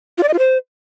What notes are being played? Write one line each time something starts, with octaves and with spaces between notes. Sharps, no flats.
F4
D5
D#5
F4
C5